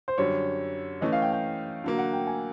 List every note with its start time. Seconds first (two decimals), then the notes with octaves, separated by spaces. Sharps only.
0.08 C5
0.18 F#2 D3 G3 C#5
1.01 E3 A3 C#4 D#5
1.13 F5
1.22 G5
1.33 G5
1.84 D3 F#3 A#3
1.98 F#5
2.13 G5
2.27 G#5